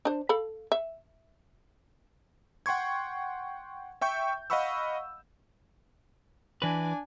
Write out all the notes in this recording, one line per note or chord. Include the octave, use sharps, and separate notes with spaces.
D4 C5
A4 F5 B5
E5
F#5 G5 C6 C#6 G#6
E5 G5 C#6 G6
D#5 F5 F#5 B5 C#6 E6
E3 D4 B4 G#5